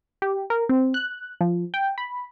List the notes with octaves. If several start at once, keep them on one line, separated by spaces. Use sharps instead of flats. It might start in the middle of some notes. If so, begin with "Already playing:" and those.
G4
A#4
C4
F#6
F3
G5
B5